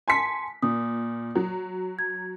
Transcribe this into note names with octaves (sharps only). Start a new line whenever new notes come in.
G#5 A5 C6 B6 C#7
A#2 D#6
F#3
G#6